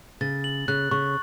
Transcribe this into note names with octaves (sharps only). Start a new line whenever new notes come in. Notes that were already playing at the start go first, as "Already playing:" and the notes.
C#3 A6
F#7
C#3 F#6
C#3 C#6